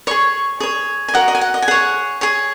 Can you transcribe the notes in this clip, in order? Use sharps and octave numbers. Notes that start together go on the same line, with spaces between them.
G#4 C#5 C#6
G#4 C#5
G#5
F#4 A#4 D#5 F#5
D#5
G#5
F#5
D#5
G#5
G#4 C#5 F#5
G#4 C#5